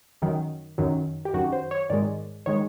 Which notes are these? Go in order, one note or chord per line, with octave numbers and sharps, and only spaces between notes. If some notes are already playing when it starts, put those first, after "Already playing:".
F#2 D#3 F#3
F#2 D#3 F#3
G4
F#2 D#3 F#3 F#4
C5
C#5
G#2 D#3 G#3 D5
D#3 G#3 C#5